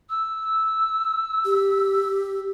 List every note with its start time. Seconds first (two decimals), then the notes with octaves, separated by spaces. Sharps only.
0.10 E6
1.45 G4